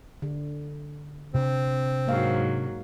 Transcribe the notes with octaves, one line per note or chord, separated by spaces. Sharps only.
D3
C3 C4 D4
G#2 F#3 A#3 F5